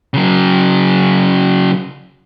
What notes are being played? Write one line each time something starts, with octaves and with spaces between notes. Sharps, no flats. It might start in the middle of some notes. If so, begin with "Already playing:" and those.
C#3 F#3